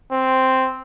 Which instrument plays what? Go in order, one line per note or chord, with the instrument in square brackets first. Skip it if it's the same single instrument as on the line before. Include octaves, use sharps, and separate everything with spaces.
[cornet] C4